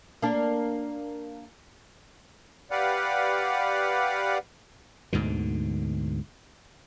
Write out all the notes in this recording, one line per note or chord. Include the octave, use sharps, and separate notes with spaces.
A#3 D4
G4 B4 D5 F5 F#5
D2 G#2 B2 D3